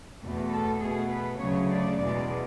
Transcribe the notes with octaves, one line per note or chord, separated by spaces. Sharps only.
E2 B2 A3
A4
B2 A3 G#4
B4
D2 C#3 F#3 A3 C#5
D5
E2 B2 G#3 D5